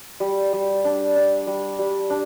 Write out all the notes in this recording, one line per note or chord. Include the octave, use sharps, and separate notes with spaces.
G3
G3
D4
D4
G3
G3
D4